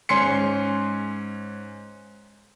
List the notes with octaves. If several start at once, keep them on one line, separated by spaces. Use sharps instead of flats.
G#2 C#4 G#5 C6 C#7